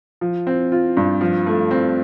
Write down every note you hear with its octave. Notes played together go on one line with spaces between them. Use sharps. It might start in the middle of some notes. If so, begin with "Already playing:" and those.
F3
C4
F4
G2
F3
A3
C4